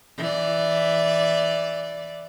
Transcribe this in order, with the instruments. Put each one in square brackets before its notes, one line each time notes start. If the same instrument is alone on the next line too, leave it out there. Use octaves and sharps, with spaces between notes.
[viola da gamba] E3 D5